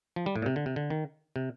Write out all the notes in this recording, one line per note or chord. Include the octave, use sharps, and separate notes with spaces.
F3
G3
A2
A#2
C3
D3
C3
D3
D#3
C3